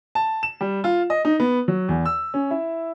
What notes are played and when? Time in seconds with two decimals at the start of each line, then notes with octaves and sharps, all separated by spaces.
0.15 A5
0.43 E7
0.61 G3
0.84 F4
1.10 D#5
1.25 D#4
1.40 B3
1.68 F#3
1.89 E2
2.06 E6
2.34 C#4
2.51 E4